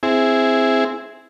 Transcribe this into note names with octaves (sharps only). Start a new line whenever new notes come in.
C4 E4 G#4